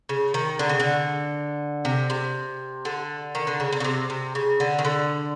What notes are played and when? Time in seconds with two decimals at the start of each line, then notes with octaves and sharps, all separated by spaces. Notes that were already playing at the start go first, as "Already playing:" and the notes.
0.09 C#3
0.34 D#3
0.59 D3
0.69 C#3
0.80 D3
1.85 C3
2.10 C3
2.85 D3
3.35 D#3
3.47 D3
3.60 C#3
3.72 C3
3.80 C#3
3.84 C3
4.10 C3
4.35 C#3
4.60 D3
4.79 D#3
4.85 D3